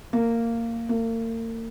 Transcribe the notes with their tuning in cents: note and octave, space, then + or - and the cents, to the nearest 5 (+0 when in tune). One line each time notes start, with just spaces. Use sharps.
A#3 -15
A#3 -40